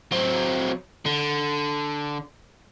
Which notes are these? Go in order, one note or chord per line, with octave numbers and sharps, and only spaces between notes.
F#3 C4
D3